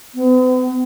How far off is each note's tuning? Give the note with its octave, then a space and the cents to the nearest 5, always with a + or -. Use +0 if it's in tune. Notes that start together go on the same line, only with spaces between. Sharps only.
B3 +45